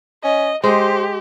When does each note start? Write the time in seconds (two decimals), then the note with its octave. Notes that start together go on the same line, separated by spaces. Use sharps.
0.24 C#4 D#5
0.64 G#3 G4 C5